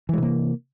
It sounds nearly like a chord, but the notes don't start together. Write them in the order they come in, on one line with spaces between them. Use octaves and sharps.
E3 G#3 C3 A#3